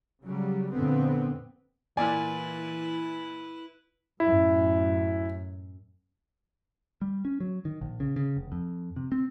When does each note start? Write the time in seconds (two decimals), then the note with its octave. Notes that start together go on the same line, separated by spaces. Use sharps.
0.23 C#3 F#3 G3
0.71 F2 A#2 D3 B3 C4
1.97 A#2 E3 E4 B4 D5 G#5
4.20 F#2 A2 E4
7.02 G3
7.25 C#4
7.40 F#3
7.65 D#3
7.81 A#1
8.00 C#3
8.16 C#3
8.37 F1
8.52 F2
8.96 C3
9.12 C4